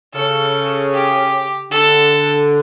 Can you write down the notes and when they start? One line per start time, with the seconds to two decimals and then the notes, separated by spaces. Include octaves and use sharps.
0.14 C#3 A4
0.93 G4
1.71 D3 A4